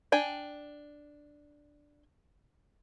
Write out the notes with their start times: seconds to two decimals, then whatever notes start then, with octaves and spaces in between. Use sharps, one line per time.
0.12 D4 G5 G#5